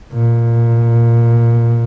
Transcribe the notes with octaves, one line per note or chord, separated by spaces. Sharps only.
A#2